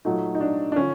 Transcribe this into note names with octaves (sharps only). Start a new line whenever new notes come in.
A#2 F#3 A3 D#4
D#4
D4
D4
D3 F3 C#4